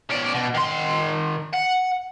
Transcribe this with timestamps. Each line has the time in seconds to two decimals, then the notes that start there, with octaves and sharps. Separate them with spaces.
0.10 C#4 D5
0.34 B2
0.54 D#3 C6
1.53 F#5